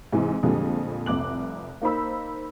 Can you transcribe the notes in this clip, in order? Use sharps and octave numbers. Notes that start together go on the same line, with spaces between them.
G#2 C3 E3
F2 A#2 D3 F3 G3 G#3
F1 C2 D6 F#6 F#7
A#3 D#4 C5 B5 E6